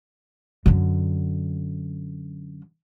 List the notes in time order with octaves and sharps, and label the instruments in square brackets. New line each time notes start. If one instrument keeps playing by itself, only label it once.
[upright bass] F#2 D3